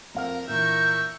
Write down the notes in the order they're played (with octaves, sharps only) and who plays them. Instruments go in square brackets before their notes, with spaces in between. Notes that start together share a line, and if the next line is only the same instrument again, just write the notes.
[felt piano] F2 F5 F6 [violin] A#4
[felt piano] A#2 D3 E3 [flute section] A#4 F6 G6 [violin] E5 C#6